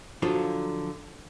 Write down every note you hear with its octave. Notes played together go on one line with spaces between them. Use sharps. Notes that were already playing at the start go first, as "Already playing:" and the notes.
D3 F3 F#3 F4 A4